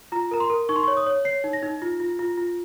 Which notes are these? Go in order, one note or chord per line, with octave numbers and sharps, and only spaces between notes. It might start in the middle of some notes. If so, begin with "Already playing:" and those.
F4 A#5
A#4 A#5
C6
A#4
D#4 C#6
C6
C#6
C#5
D#6
C#5
C#5 C7
D#4
A#6
D#4
F4
F4
F4
F4